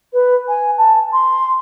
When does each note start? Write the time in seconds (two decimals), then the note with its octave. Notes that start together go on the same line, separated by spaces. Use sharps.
0.13 B4
0.48 G#5
0.78 A5
1.13 C6